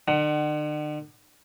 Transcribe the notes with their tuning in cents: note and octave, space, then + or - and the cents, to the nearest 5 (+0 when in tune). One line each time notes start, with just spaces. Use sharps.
D3 +45 F#5 +25